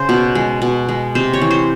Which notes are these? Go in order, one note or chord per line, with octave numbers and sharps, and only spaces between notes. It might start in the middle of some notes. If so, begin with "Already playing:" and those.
Already playing: C#3 C5
B2
G#3
B2
G#3
C3 C5
C#5
E3
C5